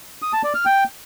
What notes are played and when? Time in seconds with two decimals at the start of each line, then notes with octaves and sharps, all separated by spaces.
0.22 D#6
0.33 A5
0.44 D5
0.55 F6
0.65 G5